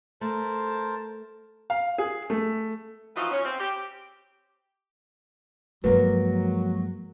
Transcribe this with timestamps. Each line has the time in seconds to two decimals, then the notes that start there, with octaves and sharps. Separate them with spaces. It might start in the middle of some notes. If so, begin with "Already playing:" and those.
0.21 A3 A#4 C5 A5
1.70 F5
1.98 G#4
2.30 A3
3.16 E3 F3 D#4 F4 F#4
3.32 C#4
3.45 C4
3.59 G4
5.84 G2 F3 F#3 G#3 A#3 A#4 B4